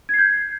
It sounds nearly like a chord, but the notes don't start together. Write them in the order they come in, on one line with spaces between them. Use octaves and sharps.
G#6 C7 G6